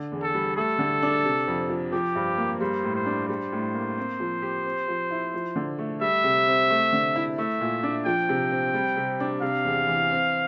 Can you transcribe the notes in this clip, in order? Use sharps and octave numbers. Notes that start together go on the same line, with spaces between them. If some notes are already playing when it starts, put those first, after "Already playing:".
Already playing: D3
E2
A4
G3
A3 A4
D3
D4
C3
F2
F3
F3 G4
G2
A#3
G3 C5
A2
C5
D4
G3 C5
A2
A#3
C4
F3
G4
C4
F3
E4
F3
D3
A3
G3 E5
C3
C4
A3
D3
E4
A3 E5
A#2
D4
F3 G5
C3
C4
G3
C3
D4
C3 F5
E2
E3
C4